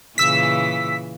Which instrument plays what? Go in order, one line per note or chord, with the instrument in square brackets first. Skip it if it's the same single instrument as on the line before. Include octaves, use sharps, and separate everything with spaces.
[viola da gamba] A#2 C#3 E3 [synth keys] E6 B6